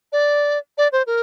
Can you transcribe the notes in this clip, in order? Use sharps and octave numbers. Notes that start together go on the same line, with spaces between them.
D5
D5
C5
A#4